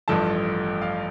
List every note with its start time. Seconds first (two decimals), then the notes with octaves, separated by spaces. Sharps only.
0.08 A1 G2 F3 A3 A5
0.82 F5